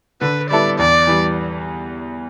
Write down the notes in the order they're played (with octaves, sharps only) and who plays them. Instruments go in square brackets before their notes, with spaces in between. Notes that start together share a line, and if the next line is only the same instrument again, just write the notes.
[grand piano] D3 [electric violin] B4
[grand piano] G3 B3 E4 A4 [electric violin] D5
[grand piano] E2 [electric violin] D5
[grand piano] E3 G3